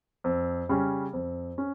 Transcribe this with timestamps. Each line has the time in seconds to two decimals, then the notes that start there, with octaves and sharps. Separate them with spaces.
0.24 F2
0.69 C#3 G3 C#4
1.13 F2
1.58 C#4